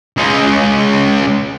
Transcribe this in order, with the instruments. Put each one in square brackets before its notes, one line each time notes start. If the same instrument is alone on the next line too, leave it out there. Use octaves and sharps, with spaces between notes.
[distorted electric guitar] C#2 G#3